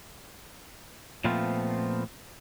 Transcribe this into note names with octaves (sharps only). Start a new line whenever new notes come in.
A#2 F3 A3 B3 C4 F4